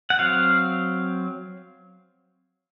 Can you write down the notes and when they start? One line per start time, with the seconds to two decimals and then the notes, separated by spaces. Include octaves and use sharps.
0.10 F#5
0.19 F#3 C4 F5